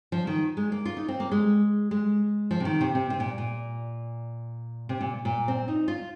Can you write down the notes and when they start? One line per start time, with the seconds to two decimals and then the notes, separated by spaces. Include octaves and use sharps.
0.12 F3
0.27 D#3
0.57 G#3
0.72 A#3
0.85 F4
0.97 D#4
1.08 C4
1.20 A#3
1.32 G#3
1.91 G#3
2.51 F3
2.60 C3
2.65 D#3
2.81 C3
2.95 C3
3.10 C3
3.20 A#2
3.38 A#2
4.89 C3
5.01 A#2
5.25 A#2
5.48 C4
5.68 D#4
5.88 F4